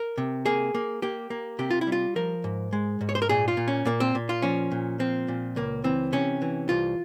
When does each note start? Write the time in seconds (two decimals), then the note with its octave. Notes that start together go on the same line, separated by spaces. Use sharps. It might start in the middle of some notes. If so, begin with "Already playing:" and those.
Already playing: A#4
0.18 C3
0.46 A#3 G#4
0.75 A#3
1.02 A#3 G4
1.30 A#3
1.59 C3 G4
1.70 F4
1.81 E4
1.87 G3
1.92 F4
2.16 F3 A#4
2.44 G#2
2.73 G#3
3.01 G#2
3.09 C#5
3.15 C5
3.22 A#4
3.29 A#2 G#4
3.48 F4
3.57 A#2
3.68 C#4
3.85 A#2 A#3
4.00 C4
4.15 A#2
4.29 F4
4.42 F3 C#4
4.72 A#2
4.99 F3 C4
5.28 A#2
5.56 C#2 A#3
5.84 E3 C4
6.12 C3 C#4
6.42 E3
6.69 C2 F4